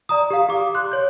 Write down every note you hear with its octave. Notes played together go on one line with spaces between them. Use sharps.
D5 A#5 D#6
G4 F5
G4 D6
C6 F#6
C#5 G6